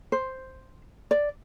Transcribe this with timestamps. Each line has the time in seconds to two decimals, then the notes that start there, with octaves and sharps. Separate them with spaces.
0.12 C5
1.11 D5